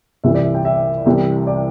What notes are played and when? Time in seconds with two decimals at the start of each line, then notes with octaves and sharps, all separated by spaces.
0.24 C2 C3 E3 E5
0.34 D5
0.44 E5
0.55 G5
0.65 E5
1.06 C2 C3 E3 G3
1.47 D5